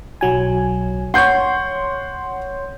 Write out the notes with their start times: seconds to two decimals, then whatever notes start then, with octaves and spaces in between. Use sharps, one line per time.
0.21 B1 F#3 G#5
1.14 C#5 F#5 C6 G6